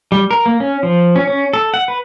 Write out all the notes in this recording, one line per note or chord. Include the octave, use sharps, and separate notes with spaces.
G3
A#4
A#3
C#4
F3
C#4
C#4
A4
F#5
B4